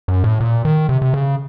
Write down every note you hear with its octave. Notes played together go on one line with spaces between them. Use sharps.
F#2
A2
A#2
D#3
C3
C3
C#3